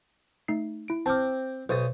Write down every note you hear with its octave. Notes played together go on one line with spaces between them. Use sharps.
A3 D#4 C7
E4 D7
C4 A5 D6 F6
B1 C5 D#6 A6